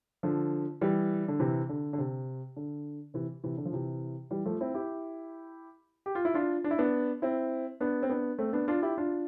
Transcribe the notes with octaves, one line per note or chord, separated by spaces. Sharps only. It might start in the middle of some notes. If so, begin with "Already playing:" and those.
D3 F3
E3 G3
D3
C3 E3
D3
D3
C3
D3
C3 E3
C3 E3
D3
F3
C3 E3
E3 G3
F3 A3
C4 E4
E4 G4
G4
F4
E4
D4 F4
D4
E4
B3 D4
C4 E4
B3 D4
C4
B3 D4
A3 C4
B3 D4
D4 F4
E4 G4
D4 F4